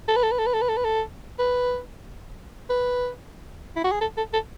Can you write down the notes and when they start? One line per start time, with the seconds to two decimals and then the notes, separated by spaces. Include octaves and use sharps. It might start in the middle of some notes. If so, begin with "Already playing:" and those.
0.08 A4
0.16 B4
0.23 A4
0.31 B4
0.38 A4
0.46 B4
0.53 A4
0.62 B4
0.69 A4
0.77 B4
0.84 A4
1.39 B4
2.70 B4
3.76 E4
3.84 F#4
3.92 G#4
4.01 A4
4.17 A4
4.33 A4